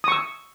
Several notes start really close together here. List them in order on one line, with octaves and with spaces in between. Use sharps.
D#6 C#6 E6